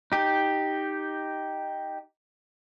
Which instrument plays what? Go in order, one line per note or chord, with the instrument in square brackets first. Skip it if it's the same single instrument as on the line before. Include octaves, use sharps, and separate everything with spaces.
[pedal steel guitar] D#4 G4